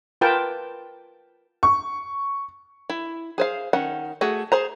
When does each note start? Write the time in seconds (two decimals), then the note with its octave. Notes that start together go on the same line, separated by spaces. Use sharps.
0.21 F4 A#4 B4 G5 A5
1.63 C#6
2.90 E4
3.38 G#4 C5 F5
3.73 D#3 C#4 F#5
4.21 A3 F#4 G#4
4.52 G#4 C5 A#5